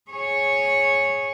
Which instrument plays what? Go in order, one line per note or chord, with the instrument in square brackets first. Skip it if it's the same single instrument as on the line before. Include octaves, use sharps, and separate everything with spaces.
[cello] G#4 C#5